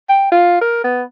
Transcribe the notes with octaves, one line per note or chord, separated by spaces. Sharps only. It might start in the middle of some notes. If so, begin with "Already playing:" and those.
G5
F4
A#4
B3